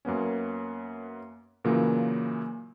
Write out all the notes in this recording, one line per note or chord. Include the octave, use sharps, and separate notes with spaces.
F#2 A#3 B3 C#4
A#2 C#3 E3 F#3 A#3